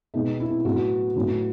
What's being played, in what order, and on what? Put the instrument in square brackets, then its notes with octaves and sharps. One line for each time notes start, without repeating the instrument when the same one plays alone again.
[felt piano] B2 G#3 B3 D#4
E4
A2 F#3 B3 F#4
A2 F#3 B3